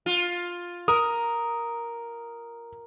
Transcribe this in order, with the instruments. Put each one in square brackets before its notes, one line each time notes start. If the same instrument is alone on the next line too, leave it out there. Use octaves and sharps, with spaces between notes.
[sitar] F4
[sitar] A#4 [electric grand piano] D#6